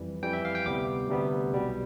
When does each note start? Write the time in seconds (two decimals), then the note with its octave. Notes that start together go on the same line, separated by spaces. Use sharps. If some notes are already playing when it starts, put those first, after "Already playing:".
Already playing: F2 E3 G3
0.23 F2 E3 G3 G5
0.33 E5
0.45 F5
0.55 G5
0.65 D2 C3 G3 B3 D6
1.09 D2 C3 G3 B3
1.53 B1 B2 G3